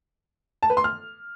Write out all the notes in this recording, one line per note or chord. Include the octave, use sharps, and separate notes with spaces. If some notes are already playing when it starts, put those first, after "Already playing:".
A5
B4
C6
F6